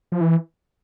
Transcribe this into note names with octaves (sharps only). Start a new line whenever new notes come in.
F3
E3